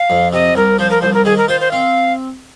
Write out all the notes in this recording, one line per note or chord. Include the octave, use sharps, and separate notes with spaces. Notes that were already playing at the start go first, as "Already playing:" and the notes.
Already playing: F5
F2
C3 D#5
C2 A#4
F3 C5
A#4
C2 C5
A#4
D#3 G#4
A#4
F4 C5
C5
C4 F5